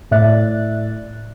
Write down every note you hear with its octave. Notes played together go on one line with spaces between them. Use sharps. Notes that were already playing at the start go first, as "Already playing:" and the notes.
A2 D5 E5 F#6 A6